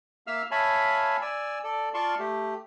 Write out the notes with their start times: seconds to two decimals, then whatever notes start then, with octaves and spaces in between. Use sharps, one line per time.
0.27 A#3 E5 F5 E6 F6
0.51 C#5 E5 F5 G#5 A5 B5
1.21 D5 G#5 E6
1.64 A4 D5
1.94 F4 D5 F5 A5 C6 C#6
2.19 A3 G4